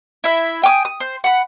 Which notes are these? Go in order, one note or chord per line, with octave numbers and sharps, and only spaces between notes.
E4 E5
G5 G#5 D6 D#6
D#6
C5
F#5 B5